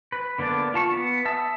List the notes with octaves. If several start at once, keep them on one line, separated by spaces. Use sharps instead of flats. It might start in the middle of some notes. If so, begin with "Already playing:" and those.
B4
D3 A#3 B3 D4 D5
F4 A5 C#6
B3
E5 A5 D#6 E6